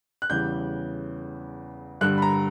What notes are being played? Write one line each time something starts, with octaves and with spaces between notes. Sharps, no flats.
F#6
E2 C#3 E3 G3 G6
G2 D3 G3 F#6
B5
A#5